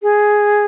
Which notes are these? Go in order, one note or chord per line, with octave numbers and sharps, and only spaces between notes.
G#4